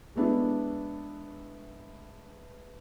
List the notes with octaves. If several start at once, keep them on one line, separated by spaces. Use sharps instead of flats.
G#3 A3 B3 D4 E4